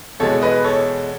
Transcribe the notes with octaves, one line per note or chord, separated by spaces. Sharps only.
E2 B2 G#3 A4 C#5
B4 D#5
A4 C#5